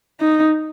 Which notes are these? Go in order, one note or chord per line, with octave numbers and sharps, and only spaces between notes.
D#4